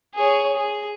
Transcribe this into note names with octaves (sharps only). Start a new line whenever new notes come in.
G#4 C#5
G#4